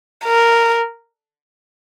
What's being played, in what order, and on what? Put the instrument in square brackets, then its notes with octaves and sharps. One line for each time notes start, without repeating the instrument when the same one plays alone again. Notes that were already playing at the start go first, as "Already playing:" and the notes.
[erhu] A#4